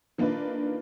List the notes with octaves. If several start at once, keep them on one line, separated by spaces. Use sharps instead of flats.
D#3 A#3 D4 F4 B4